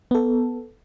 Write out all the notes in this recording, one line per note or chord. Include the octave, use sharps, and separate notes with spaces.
B3 A4